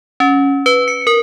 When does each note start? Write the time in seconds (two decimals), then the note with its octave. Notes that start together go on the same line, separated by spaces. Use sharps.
0.20 C#4
0.66 B4
0.88 C#7
1.07 A#4